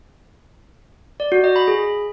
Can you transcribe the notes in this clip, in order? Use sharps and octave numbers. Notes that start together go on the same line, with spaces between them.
D5
F#4
D#5
B5
G#4